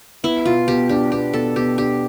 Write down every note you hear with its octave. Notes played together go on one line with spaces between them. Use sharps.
B3 E4
B2 F4
B2 G4
D4 G4
B3 G4
B2 A4
B2 G4
D4 G4